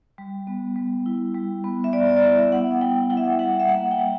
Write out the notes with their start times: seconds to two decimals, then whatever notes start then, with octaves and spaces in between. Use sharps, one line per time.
0.18 G3
0.47 B3
0.76 G3
1.06 E4
1.35 G3
1.64 B3
1.84 E5
1.93 G3 D5
2.17 D5
2.22 E4 E5
2.51 B3 F#5
2.81 G3 G5
3.10 E4 F#5
3.17 E5
3.24 F#5
3.39 G3 F#5
3.60 E5
3.69 A#3 F#5
3.91 G5
3.98 G3